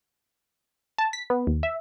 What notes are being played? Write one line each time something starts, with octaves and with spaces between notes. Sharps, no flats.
A5
B6
B3
D#2
E5